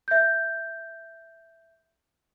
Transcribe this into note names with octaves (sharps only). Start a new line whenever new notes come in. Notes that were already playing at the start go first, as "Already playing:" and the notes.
E5 G6